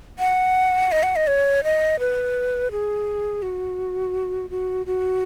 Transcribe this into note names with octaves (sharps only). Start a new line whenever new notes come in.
F#5
D#5
F#5
D#5
C#5
D#5
B4
G#4
F#4
F#4
F#4